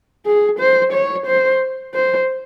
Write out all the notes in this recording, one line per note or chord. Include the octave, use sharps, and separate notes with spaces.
G#4
C5
C#5
C5
C5